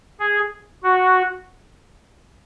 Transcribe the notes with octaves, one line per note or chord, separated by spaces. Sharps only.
G#4
F#4